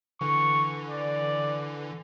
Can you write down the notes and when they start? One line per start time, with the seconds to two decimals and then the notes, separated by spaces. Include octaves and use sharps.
0.21 D3 E3 C#6
0.89 D5